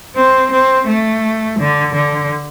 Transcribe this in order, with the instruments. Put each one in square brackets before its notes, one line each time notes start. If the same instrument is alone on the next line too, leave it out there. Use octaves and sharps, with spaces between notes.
[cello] C4
C4
A3
D3
D3